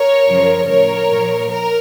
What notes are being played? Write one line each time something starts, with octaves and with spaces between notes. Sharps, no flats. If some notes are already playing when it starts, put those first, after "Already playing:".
Already playing: A#4 C#5
F#2 C#3 F3
A2 F3 A#4 C#5
A#2 F3
A#4